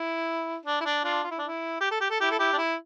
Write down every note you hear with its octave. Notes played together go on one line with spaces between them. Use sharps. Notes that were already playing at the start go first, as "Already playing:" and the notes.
Already playing: E4
D4
E4
D4
D4 F4
F4
E4
D4
E4
G4
A4
G4
A4
E4 G4
A4
E4 G4
D4
E4